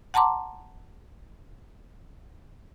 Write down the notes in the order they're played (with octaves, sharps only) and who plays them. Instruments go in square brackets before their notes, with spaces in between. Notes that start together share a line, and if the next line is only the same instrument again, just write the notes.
[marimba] F#5 A5 A#5 C6 D6